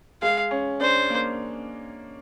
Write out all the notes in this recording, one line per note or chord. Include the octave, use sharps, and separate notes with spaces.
G#3 F5
C#4
D4 C5
A#3